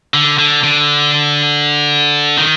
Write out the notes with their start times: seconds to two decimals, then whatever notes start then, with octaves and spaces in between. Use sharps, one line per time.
0.14 D3
0.39 D3
0.63 D3
2.37 D#3